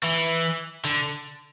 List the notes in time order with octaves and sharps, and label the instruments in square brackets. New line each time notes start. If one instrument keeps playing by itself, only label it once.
[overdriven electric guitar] E3
D3